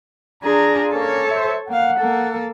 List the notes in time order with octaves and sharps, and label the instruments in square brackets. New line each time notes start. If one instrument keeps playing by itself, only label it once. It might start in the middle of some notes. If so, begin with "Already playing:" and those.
[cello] D4 G#4 [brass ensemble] F4 A#5
[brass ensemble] A#3 C#4 [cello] A4 C#5
[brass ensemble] C5 E5
[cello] A#3 F5 [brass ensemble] F#5
[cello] A#3 A4